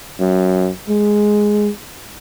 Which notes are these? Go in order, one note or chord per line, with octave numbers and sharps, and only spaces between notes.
F#2
G#3